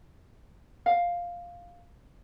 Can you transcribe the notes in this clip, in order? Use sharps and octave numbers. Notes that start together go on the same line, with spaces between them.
F5